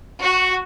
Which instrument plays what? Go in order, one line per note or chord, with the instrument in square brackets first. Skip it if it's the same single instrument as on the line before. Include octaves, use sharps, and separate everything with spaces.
[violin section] F#4